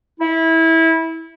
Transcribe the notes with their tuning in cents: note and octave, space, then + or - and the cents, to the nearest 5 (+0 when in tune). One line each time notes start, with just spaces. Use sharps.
E4 -20